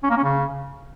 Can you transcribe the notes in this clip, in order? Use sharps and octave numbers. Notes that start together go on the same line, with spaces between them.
C#4
A#3
C#4
C#3